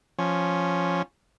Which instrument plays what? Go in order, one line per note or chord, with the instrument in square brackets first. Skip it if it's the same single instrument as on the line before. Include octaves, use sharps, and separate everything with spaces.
[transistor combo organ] F3 C#4